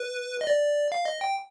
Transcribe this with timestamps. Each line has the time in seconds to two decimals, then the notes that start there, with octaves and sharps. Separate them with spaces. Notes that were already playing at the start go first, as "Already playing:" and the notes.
Already playing: B4
0.41 D#5
0.47 D5
0.92 F5
1.05 D#5
1.21 G5